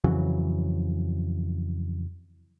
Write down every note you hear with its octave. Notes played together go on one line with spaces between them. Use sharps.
F2 C#3 E3 F#3